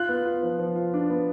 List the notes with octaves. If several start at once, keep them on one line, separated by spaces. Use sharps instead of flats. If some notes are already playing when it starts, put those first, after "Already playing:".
Already playing: F4 F#6
B3
F4
F3
F3
F4
D4
B3